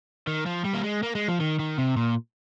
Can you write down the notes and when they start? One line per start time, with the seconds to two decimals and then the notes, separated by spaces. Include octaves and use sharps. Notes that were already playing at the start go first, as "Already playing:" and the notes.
0.27 D#3
0.46 F3
0.65 G3
0.74 A#3
0.84 G#3
1.03 A#3
1.15 G#3
1.28 F3
1.40 D#3
1.59 D#3
1.78 C3
1.97 A#2